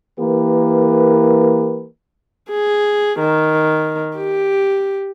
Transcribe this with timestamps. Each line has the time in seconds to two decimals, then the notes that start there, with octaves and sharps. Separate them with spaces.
0.19 E3 A#3 G4 A#4 B4
2.50 G#4
3.19 D#3
4.17 G4